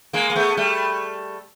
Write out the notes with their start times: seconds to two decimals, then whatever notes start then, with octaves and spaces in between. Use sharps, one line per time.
0.13 G#3 A#3
0.30 A#3
0.36 A3 B3
0.57 G3 A3